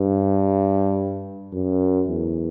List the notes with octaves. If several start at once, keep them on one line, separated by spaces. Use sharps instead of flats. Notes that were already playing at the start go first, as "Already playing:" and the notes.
Already playing: G2
F#2
E2